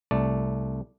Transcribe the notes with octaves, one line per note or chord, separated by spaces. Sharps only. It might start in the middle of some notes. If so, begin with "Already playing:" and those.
C2 A3 D5